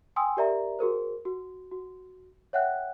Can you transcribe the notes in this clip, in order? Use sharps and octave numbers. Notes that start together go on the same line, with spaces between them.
G5 G#5 C6 D#6 E6
G4 A#4 D5 E5 A#5
F#4 G#4 A#4 C5
F#4
F#4
C#5 E5 F#5 G5 F#6